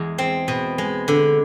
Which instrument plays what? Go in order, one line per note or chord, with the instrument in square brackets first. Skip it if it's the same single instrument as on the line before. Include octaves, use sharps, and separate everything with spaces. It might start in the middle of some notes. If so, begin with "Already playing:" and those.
Already playing: [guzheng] E2 G#3
C4
B2
G#3
D3